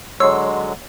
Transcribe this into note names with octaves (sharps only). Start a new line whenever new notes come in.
D3 F#3 G#3 C#5 D#5 C6 C#6 E6